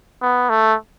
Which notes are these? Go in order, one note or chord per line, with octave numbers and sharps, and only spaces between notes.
B3
A3